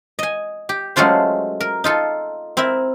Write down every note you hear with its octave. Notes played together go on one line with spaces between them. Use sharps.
D#5 G#5
G4
F#3 G#3 A3 C#4 F4 C5
A#4
D#4 F4 A4
C4 E4 A#4 E5